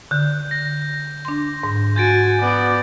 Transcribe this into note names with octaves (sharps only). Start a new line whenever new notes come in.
D3 G6
A#6
D4 C6
G#2
F#4 G#5 G6 A6 D7
B3 D5